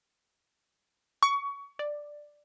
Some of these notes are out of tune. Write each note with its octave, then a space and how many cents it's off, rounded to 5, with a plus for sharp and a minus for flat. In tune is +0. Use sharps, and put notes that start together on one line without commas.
C#6 +20
D5 +5